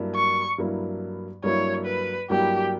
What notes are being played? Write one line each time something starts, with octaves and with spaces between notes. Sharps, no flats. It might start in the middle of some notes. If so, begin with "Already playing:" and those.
Already playing: G2 F#3 A#3 E4
C#6
G2 F#3 A#3 E4
G2 F#3 A#3 E4 C#5
B4
G2 F#3 A#3 E4 G4